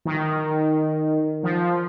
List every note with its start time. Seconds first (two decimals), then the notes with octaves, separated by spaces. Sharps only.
0.05 D#3
1.43 F3